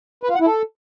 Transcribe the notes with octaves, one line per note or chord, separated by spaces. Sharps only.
B4
F4
F#5
E4
A4